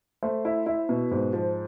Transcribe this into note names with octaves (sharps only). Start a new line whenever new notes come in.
A3 C5
E4
E4
B2
G#2
F3